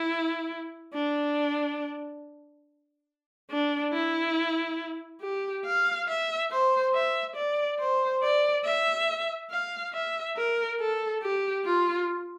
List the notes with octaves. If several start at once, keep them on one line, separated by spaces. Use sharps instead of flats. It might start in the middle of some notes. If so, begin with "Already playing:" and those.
Already playing: E4
D4
D4
E4
G4
F5
E5
C5
E5
D5
C5
D5
E5
F5
E5
A#4
A4
G4
F4